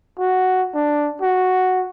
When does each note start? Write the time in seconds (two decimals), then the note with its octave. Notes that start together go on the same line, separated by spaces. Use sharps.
0.19 F#4
0.75 D4
1.21 F#4